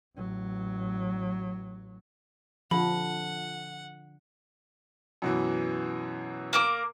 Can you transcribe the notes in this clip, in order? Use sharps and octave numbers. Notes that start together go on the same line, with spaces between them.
A1 F#3
D3 F3 F#5 B5
F#2 B2 E3
A#3 A#4 D6